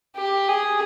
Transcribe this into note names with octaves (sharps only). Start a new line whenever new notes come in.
G4
G#4